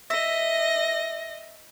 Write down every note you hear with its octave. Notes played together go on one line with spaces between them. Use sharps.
D#5 E5 A#6